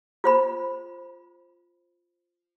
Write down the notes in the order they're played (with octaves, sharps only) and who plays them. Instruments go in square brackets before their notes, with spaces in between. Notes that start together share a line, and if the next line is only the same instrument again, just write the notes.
[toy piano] F4 C5 B5